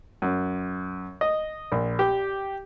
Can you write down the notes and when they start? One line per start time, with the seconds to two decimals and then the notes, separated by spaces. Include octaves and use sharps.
0.22 F#2
1.21 D#5
1.72 A#1
1.99 G4